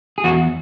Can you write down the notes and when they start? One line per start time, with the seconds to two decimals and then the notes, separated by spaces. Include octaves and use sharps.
0.18 G#4
0.24 E2 F#4